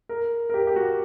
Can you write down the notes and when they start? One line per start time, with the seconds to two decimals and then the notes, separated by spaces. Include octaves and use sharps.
0.09 A#4
0.50 A#4
0.54 G4
0.67 G4
0.76 F#4